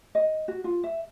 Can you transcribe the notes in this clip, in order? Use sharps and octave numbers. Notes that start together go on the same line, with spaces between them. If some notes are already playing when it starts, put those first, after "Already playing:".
D#5
F#4
F4
E5